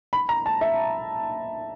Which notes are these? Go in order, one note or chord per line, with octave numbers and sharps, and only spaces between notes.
B5
A#5
A5
E5